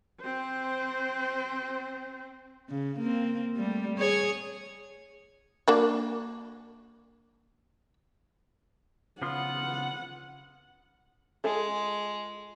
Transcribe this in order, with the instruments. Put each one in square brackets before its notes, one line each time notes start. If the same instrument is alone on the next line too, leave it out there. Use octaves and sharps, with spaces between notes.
[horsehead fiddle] C4 C5
[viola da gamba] C#3
A#3 C4
G3 A3
G#4 C#5
[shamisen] A#3 D4 F#4
[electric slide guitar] C#3 B3 F4 [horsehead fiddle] F#5
[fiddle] G#3 [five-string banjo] F4 G#4 A4